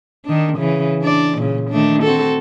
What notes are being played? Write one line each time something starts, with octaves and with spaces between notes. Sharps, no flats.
D#3 D4
C#3 E3
D4 D5
A#2 C#3
D#3 A3 D4
C4 F#4 A4